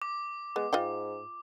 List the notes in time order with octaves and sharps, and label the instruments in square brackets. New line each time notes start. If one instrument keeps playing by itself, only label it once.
[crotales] D6
[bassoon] G#3 [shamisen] B3
[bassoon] G#2 [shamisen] F4 D#5 G5